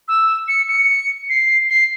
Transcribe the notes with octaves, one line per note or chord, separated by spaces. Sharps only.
E6
C#7
C#7
C7
C7